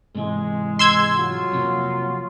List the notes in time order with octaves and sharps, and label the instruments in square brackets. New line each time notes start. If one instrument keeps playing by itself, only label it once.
[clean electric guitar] G#2 C3 E3 [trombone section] G#3
[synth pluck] C6 E6 G#6
[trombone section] F#3 F4 F#4
[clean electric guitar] F2 C3 A#3